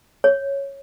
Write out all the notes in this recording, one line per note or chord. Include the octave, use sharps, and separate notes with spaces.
C#5